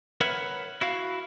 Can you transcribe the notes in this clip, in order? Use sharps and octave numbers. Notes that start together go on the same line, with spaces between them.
A#4 B4 C#5 E5 F#5 B5
E4 F#4 F5